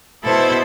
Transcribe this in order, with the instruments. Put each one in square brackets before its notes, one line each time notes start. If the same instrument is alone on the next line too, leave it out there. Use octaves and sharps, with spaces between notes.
[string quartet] B2 B3 E4 A4 C5